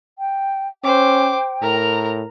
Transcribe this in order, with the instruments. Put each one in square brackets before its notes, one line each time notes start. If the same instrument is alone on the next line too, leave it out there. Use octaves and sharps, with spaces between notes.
[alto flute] G5
[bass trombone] C#4 [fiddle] C5 D6 [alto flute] G5
[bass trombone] A2 [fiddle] A#4 A#5